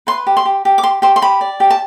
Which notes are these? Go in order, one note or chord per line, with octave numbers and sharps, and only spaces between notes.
B4 C6
G4
C6
G4
G4
D6
G4 C6
G4 C6
C6
G4 B5
D5
G4
A5